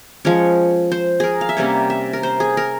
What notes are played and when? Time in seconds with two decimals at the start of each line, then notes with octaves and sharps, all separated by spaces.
0.25 F3 G#3 C#4 C#5
0.92 C5
1.20 G#4 A#4
1.41 F5
1.49 E5
1.57 C3 G3 A#3 C#4 C#5
1.90 E5
2.13 A#4
2.23 C5
2.40 G#4
2.57 A#4